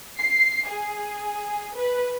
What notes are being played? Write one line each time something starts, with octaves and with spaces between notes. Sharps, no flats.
C7
G#4
B4